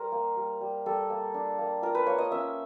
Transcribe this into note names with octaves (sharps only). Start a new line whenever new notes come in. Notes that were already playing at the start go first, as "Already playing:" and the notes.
Already playing: G3 A#4 C5
A#3
G3
G3
G3 A4
A#3
D4
A#3
F4 A#4
B4
A#3 C#5
D#5
C#4 E5